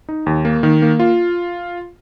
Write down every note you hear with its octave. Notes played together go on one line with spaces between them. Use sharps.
D#4
D#2
A#3
D#3
A#3
F4